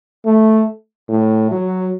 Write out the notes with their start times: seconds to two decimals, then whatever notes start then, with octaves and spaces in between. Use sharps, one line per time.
0.25 A3
1.08 A2
1.51 F#3